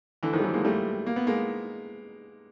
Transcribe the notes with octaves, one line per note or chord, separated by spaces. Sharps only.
D3 E3
D#3 F3
G3
E3 F#3
G#3 A#3
G3 A3
A#3
B3
G#3 A#3